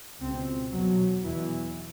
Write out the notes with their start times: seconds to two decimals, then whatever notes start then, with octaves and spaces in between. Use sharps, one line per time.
0.20 C#2 B2 C4
0.71 E2 B2 F#3
1.23 E2 B2 E3